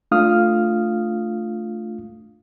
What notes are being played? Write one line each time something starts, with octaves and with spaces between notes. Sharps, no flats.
A3 D4 F4 F5 D#6 F6